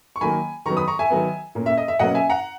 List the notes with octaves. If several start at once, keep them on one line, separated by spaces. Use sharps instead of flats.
C#6
D#3 F#3 A#3 G#5 B5
D#3 F#3 B3 A#5 C#6
B5 D#6
A#5 C#6
E5 G#5
D#3 F#3 B3
A#2 A#3 C#4
E5
D#5
E5
B2 F#3 A#3 C#4 D#5 F#5
E5 G#5
F#5 A#5